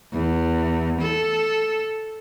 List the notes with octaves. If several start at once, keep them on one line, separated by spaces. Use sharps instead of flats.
E2
A4